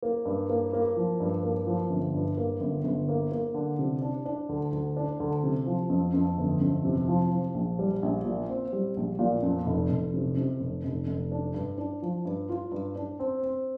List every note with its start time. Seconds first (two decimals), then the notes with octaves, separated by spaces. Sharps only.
0.03 A#3
0.25 G2
0.50 A#3
0.73 A#3
0.96 F3
1.20 G2
1.43 A#3
1.67 F3
1.90 G1
2.14 G2
2.37 A#3
2.60 G1
2.84 G1
3.08 A#3
3.32 A#3
3.54 D3
3.79 C3
4.02 D4
4.25 D4
4.49 D2
4.72 D2
4.97 D4
5.20 D2
5.44 C3
5.66 F3
5.90 F2
6.14 F2
6.38 G1
6.61 F2
6.85 C3
7.08 F3
7.31 F3
7.54 A#1
7.79 G3
8.02 A#1
8.25 A#2
8.49 C4
8.73 G3
8.97 A#1
9.19 A#2
9.43 F2
9.66 F1
9.90 F1
10.14 C3
10.37 C3
10.60 F1
10.84 F1
11.07 F1
11.32 D4
11.54 G2
11.78 D4
12.02 F3
12.25 G2
12.49 F4
12.72 G2
12.96 D4
13.19 C4
13.43 C4